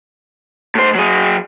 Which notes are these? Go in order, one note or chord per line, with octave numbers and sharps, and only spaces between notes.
A2 C5
F#3 G#4